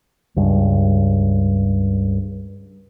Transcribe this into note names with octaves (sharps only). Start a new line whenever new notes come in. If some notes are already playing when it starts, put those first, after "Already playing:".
C#2 G2